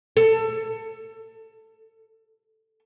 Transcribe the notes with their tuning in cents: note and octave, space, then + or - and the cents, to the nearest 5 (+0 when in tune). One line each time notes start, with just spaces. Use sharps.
A4 +25